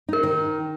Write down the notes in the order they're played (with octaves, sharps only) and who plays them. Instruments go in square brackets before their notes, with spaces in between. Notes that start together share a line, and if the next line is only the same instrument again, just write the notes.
[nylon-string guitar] D#4 [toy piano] A#4
[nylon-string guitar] D#3